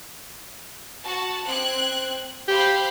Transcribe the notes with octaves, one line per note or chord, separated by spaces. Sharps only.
F#4 A5
C4 F#6 G#6
G4 C5 F5 B5